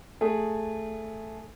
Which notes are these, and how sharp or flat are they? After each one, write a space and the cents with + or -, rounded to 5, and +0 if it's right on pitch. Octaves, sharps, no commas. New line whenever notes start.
A3 +0 G#4 +0